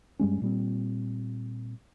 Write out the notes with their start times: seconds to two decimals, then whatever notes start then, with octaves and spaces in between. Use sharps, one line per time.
0.19 G2 G3 G#3 C#4
0.42 A#2 G3 C4